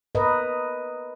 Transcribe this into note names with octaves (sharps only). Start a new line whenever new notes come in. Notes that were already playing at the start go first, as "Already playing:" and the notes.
A#4 B4 D#5